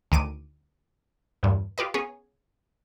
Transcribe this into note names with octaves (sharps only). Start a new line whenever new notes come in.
D2 D#3 D6 D#7
E2 G2 A#2
F4 G4 B4 D#5
B3 C#4 G#4 C#5